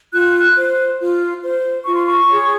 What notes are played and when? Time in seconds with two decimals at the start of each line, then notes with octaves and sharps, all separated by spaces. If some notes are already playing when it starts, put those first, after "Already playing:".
0.12 F4 F#6
0.55 C5
0.98 F4
1.42 C5
1.84 F4 C#6
1.95 C6
2.05 C#6
2.28 G#4 C#5